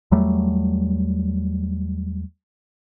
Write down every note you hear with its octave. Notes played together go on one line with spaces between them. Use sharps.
E2 F#3 G3 A3